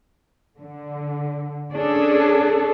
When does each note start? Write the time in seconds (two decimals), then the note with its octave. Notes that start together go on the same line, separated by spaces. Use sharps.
0.59 D3
1.71 C#4 D4 G#4 A4